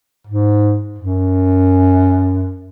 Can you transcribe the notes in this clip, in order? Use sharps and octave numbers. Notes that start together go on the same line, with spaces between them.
G#2
F#2